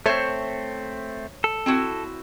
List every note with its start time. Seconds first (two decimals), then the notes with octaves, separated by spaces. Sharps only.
0.06 A3 C4 C5 C#5 E5
1.44 A4
1.66 C4 E4 F#4